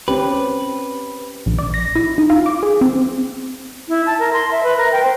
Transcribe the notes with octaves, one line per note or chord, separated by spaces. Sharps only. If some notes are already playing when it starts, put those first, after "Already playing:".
C4 C#4 G4 B4
A#1
D5
A#6
E4
D#4
F4
D6
G#4
C4
E4
A5
A#4
C6
E5
B4
A#4
G5
C5